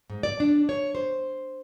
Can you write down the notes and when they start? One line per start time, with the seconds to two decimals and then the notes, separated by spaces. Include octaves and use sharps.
0.10 G#2
0.23 D5
0.40 D4
0.69 C#5
0.95 C5